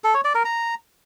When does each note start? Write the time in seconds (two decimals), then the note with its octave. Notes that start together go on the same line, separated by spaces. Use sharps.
0.04 A4
0.14 C#5
0.24 D5
0.35 A#4
0.45 A#5